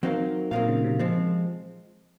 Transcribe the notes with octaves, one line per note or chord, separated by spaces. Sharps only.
F#3 C4 D#4 A#4 F5
A#2 F#3 C4 D#4 A#4 F5
C#3
C3
A#2 F3 G#3 C4